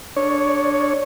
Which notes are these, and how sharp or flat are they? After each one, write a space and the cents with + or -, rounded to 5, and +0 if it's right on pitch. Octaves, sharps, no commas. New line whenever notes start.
D4 +0 C#5 +0